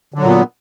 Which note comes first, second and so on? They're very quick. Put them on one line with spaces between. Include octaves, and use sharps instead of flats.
D3 F#3 A#2 B3